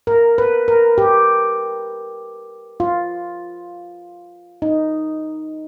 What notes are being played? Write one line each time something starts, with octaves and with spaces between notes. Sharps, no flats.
A#4
B4
A#4
G4
F4
D#4